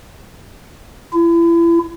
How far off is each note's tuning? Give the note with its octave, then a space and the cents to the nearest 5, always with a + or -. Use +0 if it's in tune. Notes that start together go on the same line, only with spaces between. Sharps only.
E4 +35